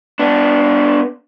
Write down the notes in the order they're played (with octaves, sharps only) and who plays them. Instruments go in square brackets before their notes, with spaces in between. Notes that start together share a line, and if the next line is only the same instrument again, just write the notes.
[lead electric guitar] B3 D4